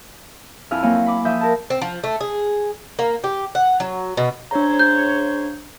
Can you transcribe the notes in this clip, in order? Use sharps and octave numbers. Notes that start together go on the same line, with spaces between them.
F2 E4 G#5 F6
F#3 A#3 C4 C#5 G#5
B5 D6
F3 E5 D#6 G6
A#4 A5
C4
F3
A3
G#4
A#3
G4
F#5
F#3
B2
C#3 D4 C5 C#5 A#5
G6